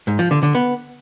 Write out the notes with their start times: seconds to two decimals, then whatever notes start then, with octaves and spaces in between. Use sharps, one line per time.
0.07 G#2
0.19 F3
0.31 D3
0.43 D3
0.55 B3